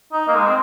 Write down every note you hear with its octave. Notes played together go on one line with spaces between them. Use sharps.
D#4
A#3
G#3
C4